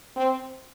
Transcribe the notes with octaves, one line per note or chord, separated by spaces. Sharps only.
C4